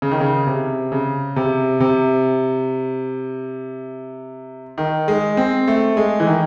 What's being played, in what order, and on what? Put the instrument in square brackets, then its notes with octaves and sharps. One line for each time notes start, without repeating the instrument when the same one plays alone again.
[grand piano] C#3
D#3
C#3
C3
C#3
C3
C3
D#3
G#3
C4
A3
G#3
E3
D#3